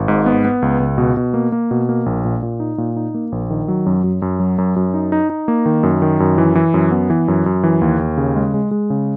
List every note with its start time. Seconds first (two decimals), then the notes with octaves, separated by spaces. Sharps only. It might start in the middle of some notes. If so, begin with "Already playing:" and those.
Already playing: G#1
0.08 G#2
0.26 B3
0.45 B3
0.62 C#2
0.80 C#2
0.98 B2
1.17 B2
1.34 A#3
1.52 A#3
1.71 B2
1.89 A#3
2.06 A#1
2.25 A#2
2.43 A#2
2.60 D#4
2.78 A#2
2.96 D#4
3.15 A#3
3.32 A#1
3.50 D#3
3.68 F#3
3.86 F#2
4.04 F#2
4.22 F#2
4.40 F#3
4.58 F#2
4.76 F#2
4.94 D#4
5.12 D#4
5.30 D#4
5.48 A#3
5.66 D#3
5.83 F#2
6.02 D#3
6.20 F#2
6.38 E3
6.55 E3
6.74 F#2
6.91 B3
7.10 E3
7.28 F#2
7.46 F#2
7.63 E3
7.82 D#2
7.99 D#2
8.18 C#3
8.36 G#3
8.54 G#3
8.71 G#3
8.90 C#3